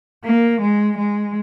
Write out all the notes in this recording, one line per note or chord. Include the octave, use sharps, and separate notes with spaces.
A#3
G#3
G#3